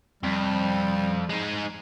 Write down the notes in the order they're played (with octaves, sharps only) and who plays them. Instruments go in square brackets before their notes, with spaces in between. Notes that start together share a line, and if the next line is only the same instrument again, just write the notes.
[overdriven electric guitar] F2 [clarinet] G3
[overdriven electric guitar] G#3 D#4